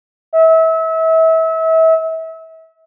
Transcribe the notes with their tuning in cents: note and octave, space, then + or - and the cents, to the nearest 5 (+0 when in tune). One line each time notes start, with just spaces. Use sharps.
E5 -30